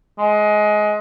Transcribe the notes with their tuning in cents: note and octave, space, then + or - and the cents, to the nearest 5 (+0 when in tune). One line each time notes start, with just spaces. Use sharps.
G#3 +20